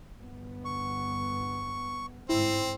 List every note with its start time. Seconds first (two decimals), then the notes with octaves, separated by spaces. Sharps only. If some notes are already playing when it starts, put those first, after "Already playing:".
0.21 G1 B3
0.65 C#6
2.29 G1 G#2 C4 E4